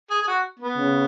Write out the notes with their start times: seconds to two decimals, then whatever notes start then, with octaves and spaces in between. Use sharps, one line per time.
0.10 G#4
0.22 G#4
0.27 F#4
0.59 B3
0.77 C#3